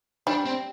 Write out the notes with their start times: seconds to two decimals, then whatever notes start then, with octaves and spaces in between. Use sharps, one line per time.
0.27 G3 D4
0.45 C4